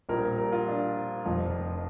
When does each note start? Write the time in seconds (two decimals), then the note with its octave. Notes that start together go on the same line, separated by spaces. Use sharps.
0.09 A#1 A#2 G3 A#4
0.38 A#4
0.52 F4
0.67 D4
1.25 F1 F2 F3